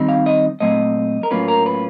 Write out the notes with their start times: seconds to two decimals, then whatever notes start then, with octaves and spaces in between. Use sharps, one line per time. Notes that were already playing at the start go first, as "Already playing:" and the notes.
Already playing: D#3 G3 C4 D#4
0.09 F5
0.26 D#5
0.60 A#2 F#3 A3 C4 D#5
1.23 A#4
1.31 A2 F#3 A#3 C#4 F4 B4
1.48 A#4
1.66 B4